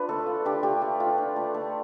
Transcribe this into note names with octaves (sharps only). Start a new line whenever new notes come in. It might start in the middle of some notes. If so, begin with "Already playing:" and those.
Already playing: D4 F4 B4
A3 A4
F4
D4 G4
A3 G4
A3
F4
D4
A3
A3